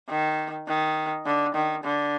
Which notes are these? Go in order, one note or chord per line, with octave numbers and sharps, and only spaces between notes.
D#3
D#3
D3
D#3
D3